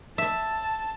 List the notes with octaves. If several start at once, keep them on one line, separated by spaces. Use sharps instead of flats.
E5 A5